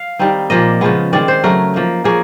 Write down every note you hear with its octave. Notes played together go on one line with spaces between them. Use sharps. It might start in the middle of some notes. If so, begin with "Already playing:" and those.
Already playing: F5
D#3 G3 C4 D#4
A#2 F3 A#3 D#5
C#3 F3 G#3 B3
D#3 G#3 C4 D5
C5
C#3 F#3 A3 A#4
F3 A#3 D#4
F3 A#3 C#4 G#4